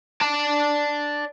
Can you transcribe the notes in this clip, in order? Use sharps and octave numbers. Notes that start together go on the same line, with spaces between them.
D5 A5